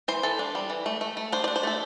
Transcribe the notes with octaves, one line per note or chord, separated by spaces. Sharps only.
E3 C5
E3 A4
D4
G3
E3
A3
A3
A3
D4 C5
D5
D4
C5
A3 A4